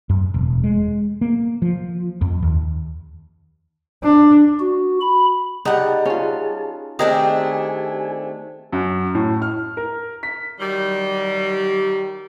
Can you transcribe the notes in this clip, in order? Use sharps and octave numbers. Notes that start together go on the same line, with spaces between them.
F#2
E1
G#3
A#3
F3
F2
D#2
D4
F#4
B5
G3 D#4 G#4 F#5 A5
C#4 F4
D#3 A3 C4 D4 G4 G#4 A#4 G#5
F#2
A2
F6
A#4
B6
D#3 F#3 G3